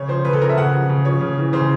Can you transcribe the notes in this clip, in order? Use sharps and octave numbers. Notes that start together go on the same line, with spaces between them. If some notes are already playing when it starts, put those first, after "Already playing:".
Already playing: C#3 C#5
F3 C5
C#3 B4
A4
F3 A#4
E5
C#3 F#5
F3
C#3
F3 C#5
C#3
E3
C#3 C5